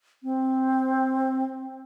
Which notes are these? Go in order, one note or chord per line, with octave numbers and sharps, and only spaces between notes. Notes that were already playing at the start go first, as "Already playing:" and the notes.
C4